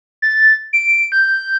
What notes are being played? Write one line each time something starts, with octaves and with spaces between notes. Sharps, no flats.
A6
D7
G6